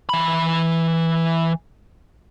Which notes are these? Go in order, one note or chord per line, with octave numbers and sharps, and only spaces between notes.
E3 B5